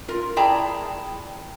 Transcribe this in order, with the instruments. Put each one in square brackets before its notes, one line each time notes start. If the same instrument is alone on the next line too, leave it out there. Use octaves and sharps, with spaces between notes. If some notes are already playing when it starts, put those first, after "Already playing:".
[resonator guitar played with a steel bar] F4 A#4
E4 G#4 D5 G5 A5 A#5